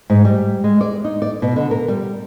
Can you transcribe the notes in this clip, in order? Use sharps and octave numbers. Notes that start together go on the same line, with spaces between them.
G#2
G3
G#3
D5
D#4
D5
B2
D3
A#4
G3